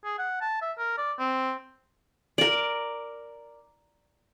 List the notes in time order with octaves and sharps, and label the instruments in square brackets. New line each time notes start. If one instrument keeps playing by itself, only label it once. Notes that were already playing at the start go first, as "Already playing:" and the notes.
[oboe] G#4
F#5
A5
E5
A#4
D5
C4
[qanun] A#4 D5